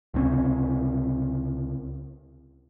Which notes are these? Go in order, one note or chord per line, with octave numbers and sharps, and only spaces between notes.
C#2 C3 C4 C#4